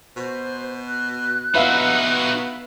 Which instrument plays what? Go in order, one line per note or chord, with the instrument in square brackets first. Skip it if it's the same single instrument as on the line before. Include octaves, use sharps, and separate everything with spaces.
[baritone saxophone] B2 [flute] C5
[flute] F#6
[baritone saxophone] B3 [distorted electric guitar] D#4 F#4 [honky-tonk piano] B4 E5 F5